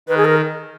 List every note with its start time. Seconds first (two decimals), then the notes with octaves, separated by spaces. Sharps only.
0.08 D#3 B4
0.17 G#4
0.25 A#4